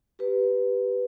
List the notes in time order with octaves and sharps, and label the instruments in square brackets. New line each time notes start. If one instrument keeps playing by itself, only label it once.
[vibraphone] G4 B4